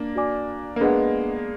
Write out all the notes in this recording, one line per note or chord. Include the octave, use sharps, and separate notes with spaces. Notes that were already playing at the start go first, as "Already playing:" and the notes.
Already playing: A#3 D4
F#4 D5 G#5 D6
A#3
G#3 B3 D4 G#4 B4 D#5 F#5